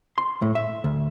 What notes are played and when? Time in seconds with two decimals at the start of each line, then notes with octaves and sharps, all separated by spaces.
0.18 C6
0.42 A2
0.55 E5
0.84 D2